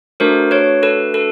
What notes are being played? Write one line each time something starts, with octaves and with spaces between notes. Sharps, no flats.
A3 D4 F#4 A4 A#4 C5
B4 C#5
A4 B4
A4 B4